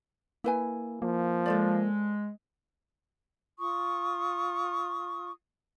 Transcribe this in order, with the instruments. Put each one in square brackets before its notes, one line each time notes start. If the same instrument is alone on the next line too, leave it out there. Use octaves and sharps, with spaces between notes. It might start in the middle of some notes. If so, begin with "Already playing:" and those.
[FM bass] A#3 [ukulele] E4 B4 G#5
[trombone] F3 [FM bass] A#3
[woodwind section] G#3 [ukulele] A4 C5 D5
[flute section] F4 C#6 D#6